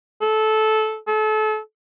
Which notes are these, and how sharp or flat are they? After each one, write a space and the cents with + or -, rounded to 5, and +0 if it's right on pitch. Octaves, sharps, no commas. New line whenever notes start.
A4 -15
A4 -35